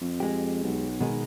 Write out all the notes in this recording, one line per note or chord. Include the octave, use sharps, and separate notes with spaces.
F2
G#3 G4
B1
B2 D#3 G#3